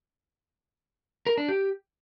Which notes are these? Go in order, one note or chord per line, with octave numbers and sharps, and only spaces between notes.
A#4
D4
G4